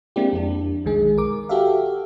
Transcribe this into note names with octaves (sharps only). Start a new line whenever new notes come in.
G#3 A#3 C4 D4 E4 G4
F2 D4
B1 D#3 G#3 G#4
A#4 D6
F#4 G4 A4 E5 F5